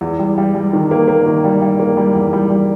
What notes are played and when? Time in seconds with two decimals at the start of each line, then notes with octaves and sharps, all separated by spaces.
0.01 E2
0.19 G3
0.38 G3
0.55 G3
0.73 D#3
0.91 A#3
1.08 A#3
1.26 D#3
1.45 G3
1.62 G3
1.79 A#3
1.97 G3
2.15 E2
2.33 G3
2.50 G3